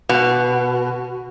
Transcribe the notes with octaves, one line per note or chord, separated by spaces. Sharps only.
B2